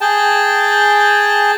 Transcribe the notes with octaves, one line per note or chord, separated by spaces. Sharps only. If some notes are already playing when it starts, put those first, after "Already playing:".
G#4 G5 A5